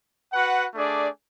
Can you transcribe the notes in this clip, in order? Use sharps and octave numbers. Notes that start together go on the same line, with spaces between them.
F#4 B4 F#5
A3 D4 G#4 D5